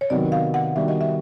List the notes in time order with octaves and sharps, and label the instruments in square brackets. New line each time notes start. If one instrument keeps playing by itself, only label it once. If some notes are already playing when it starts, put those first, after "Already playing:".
[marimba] C#5
[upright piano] C3 D#3 F#3 B3 [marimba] D5
[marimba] F5
F#5
[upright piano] D#3 G3 B3 D4 F#4 [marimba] E5
[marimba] D#5
E5